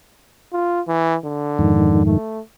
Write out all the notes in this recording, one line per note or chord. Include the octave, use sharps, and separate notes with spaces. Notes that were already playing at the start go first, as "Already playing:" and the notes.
F4
E3
D3
F2 G#2 D#3
A3